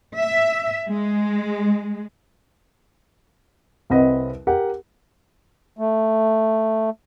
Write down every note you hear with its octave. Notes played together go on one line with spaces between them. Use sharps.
E5
G#3
C2 C4 B4 D#5 F#5
G4 A#4 F#5
A3